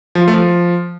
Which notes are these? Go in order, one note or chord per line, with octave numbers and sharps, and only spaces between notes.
F3
F4
A3
F3